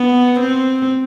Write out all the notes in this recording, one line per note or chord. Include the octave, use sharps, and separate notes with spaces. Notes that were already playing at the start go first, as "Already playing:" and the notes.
Already playing: B3
C4